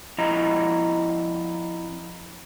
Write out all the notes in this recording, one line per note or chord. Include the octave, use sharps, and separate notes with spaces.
F2 E4 D#5 A#5